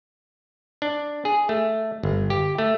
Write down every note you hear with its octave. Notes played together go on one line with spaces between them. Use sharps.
D4
G#4
A3
G1
G4
A3